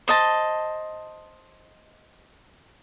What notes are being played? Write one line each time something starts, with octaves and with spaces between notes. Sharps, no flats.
C5 D#5 A5